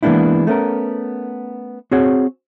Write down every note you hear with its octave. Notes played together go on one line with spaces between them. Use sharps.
E3 G#3 A#3 B3 D4 E4
A3 B3 C#4 A#4
C4 F#4 G#4 C#5 F#5